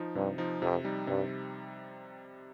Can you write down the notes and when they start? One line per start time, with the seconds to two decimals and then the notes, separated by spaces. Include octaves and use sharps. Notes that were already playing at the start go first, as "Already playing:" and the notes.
Already playing: F3 D#4
0.15 G2 C3
0.38 F3 D#4
0.62 F2 C3
0.84 G3 D#4
1.07 G2 C3